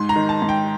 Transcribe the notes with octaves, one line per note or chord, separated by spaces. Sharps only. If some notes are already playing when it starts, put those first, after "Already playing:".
Already playing: G#2 C6
A#5
D#3
A5
G#2
G5